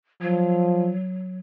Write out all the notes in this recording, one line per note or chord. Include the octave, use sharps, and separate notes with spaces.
F3 F#3